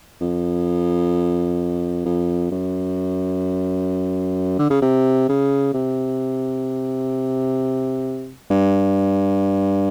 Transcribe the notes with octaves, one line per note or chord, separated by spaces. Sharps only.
F2
F2
F#2
D3
C#3
C3
C#3
C3
G2